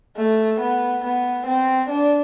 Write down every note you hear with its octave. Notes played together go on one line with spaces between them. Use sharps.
A3
B3
B3
C4
D4